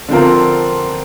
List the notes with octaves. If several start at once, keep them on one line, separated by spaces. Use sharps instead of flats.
D3 F3 C4 F4 A#4